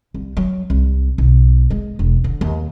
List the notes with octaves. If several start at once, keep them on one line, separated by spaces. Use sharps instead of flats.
C2
F#3
C2
B1
G#3
E1
D3
D#2